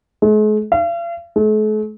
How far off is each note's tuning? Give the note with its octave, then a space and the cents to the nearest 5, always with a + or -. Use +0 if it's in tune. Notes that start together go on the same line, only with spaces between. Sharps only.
G#3 +45
F5 -40
A3 -45